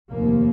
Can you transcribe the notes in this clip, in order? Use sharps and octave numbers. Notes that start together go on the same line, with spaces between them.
F1 D#2 A#3